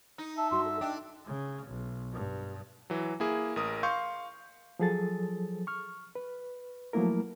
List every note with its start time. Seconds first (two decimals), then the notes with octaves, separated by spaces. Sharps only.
0.18 D#4
0.37 E5 A5
0.51 G2 F#4 C6
0.65 A4
0.81 D4 D#4 G5
1.26 C#3
1.68 B1
2.13 G2
2.90 E3 F#3
3.20 A#3 E4 G#4
3.56 A1 A#4 D#6
3.83 F5 C6 C#6 G6
4.79 F3 F#3 G#4 A4 A6
5.67 C#6 F6
6.15 B4
6.93 F3 F#3 A3 A#3 E4 A#4